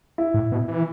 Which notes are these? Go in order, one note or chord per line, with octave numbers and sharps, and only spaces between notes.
E4
A2
B2
E3